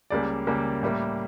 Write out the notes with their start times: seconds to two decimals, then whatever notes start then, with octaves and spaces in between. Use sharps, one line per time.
0.10 C#2 C#3 G3 A#3 D5
0.47 C#2 C#3 G3 A#3
0.83 A2 G3 A#3